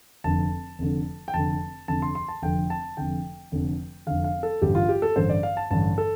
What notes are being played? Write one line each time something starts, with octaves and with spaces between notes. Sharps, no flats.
F1 F2 D3 A5
F1 F2 D3
G5
F1 F2 D3 A5
F1 F2 D3 A5
C6
C6
A5
F1 F2 D3 G5
A5
F1 F2 D3 G5
F1 F2 D3
F1 F2 D3 F5
F5
A4
A1 G2 D3 G4
F4
G4
A4
A1 G2 D3 C5
D5
F5
A5
A1 G2 D3 A5
A4